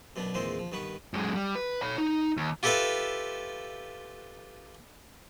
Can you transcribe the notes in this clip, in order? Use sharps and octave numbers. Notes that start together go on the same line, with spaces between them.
F#2 B2 B3 D4
E2 A#2 D#3 G#3 C4 C5
F3
G2 D#3 B3 B4 C#6
F#2 G#3
G3
B4
C#5 B5
D#4
D#2
F4 G4 A4 B4 E5 F5